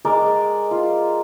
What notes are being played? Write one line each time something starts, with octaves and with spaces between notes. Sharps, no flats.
G#3 A#4 D5
F4